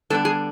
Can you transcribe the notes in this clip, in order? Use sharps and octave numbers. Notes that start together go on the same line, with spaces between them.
D3 G3 B3 D4 A4
G#4